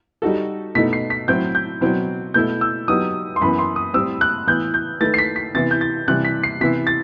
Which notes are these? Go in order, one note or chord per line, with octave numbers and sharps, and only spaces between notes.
G3 D#4 F#4 A4
B2 A3 D#4 B6
C7
B6
A2 F#3 C4 E4 G6
G6
B2 F#3 C4
B2 A3 E4 G6
E6
F#3 B3 D#4 G4 D#6
C6
F#2 E3 B3 B5
C6
D#6
A2 G3 C4 E6
F#6
A2 E3 B3 G6
G6
D#3 A3 E4 B4 A6
C7
B6
B6
C3 E3 B3 E4 A6
G6
A6
C3 E3 G3 F#6
B6
C7
C3 E3 B3 E4 B6
A6